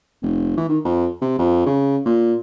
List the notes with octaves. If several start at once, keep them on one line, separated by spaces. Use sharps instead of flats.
F1
E3
D#3
F2
C3
F2
C#3
A#2